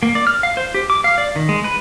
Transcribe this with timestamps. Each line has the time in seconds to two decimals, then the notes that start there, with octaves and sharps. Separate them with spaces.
0.03 A#3
0.15 D5
0.27 F6
0.43 F5
0.57 C5
0.74 G4
0.90 D6
1.04 F5
1.18 D5
1.36 D#3
1.49 G#3
1.64 B4